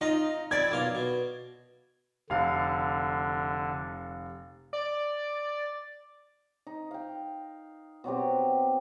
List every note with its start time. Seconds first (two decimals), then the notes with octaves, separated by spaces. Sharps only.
0.01 D#4 F4 D#5 A#5
0.51 F2 D5 B5 G#6 A6
0.71 B1 A#2 F5
0.95 B2
2.30 F1 D3 F5
4.73 D5
6.67 D#4
6.91 F5 G5
8.04 B2 F#3 C4 G4